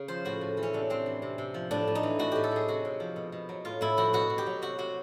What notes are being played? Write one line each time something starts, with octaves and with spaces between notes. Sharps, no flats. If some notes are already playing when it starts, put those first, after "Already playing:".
Already playing: C#3
F3 C5
A2 F#4
A2
E3
C#4
C3 D4
C3 C4
E3
C3
C3
F3
A2 D4
A2
D#4
E3
A2 F#4
A2 G4
A4
F#3 G#4
C3 F#4
C3
F3
B2
B2
F#3
A2 F4
A2 E4
F3 F#4
B2 F#4
B2
G4
F#3
C3 F#4
C3 F#4